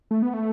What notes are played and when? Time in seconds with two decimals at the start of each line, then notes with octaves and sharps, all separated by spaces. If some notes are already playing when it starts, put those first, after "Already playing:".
0.11 A3
0.22 B3
0.34 A3